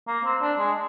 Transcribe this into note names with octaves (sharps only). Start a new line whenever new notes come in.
A#3
C4
D4
G#3